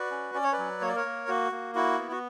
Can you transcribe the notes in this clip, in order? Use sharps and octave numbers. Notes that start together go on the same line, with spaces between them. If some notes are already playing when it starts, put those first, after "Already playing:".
Already playing: F#4 B4 D5
C#4
C#4 D5
C#5
B4 D5
F#3
A#3 C#5
D5
A#4 C#5
A#3
A#3 F#4
A#3
E4 F#4
B3
F#4